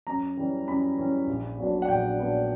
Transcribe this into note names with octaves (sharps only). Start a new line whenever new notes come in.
F#2 A#5
E3 G3 C#4
F#2 B5
E3 G3 C#4
A#1
A#2 F#3 B3 D4
F#5
A#1 G5
A#2 F#3 B3 D4